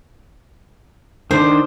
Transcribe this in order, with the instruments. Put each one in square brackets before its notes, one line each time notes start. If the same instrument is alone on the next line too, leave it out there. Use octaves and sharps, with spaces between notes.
[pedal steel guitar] D#3 D4 [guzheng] C5